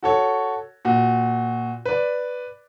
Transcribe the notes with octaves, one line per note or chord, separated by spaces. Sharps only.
F#4 A4 C#5
A#2 F#4
B4 D5